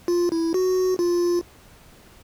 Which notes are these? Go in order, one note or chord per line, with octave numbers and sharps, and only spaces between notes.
F4
E4
F#4
F4